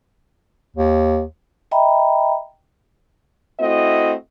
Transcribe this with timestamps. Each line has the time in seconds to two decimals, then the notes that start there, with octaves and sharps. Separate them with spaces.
0.76 D#2
1.71 D#5 E5 G5 A#5 B5
3.59 A3 C4 E4 F#4 D#5